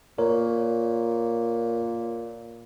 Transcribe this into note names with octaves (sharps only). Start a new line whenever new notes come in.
A#2 A#4 C#5